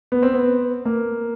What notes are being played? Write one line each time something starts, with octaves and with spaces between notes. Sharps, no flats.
B3
C4
B3
A#3